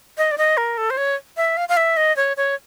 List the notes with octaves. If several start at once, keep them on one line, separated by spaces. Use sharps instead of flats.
D#5
D5
D#5
A#4
A4
C5
C#5
E5
F5
F5
E5
D#5
C#5
C#5